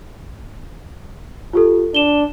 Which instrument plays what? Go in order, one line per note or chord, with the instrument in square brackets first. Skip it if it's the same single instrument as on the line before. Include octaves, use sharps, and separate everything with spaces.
[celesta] F4 G4 A4
[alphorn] D4 [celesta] E7 G7